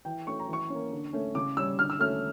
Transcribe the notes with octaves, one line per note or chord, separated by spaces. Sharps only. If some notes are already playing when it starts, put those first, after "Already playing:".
E3 G5
A3 C#4 C#6
A#5
E3 C#6
A#3 C#4
D3
A3 C#4
C#3 D6
G3 C#4 E6
D3 F6
E6
A3 C#4 F6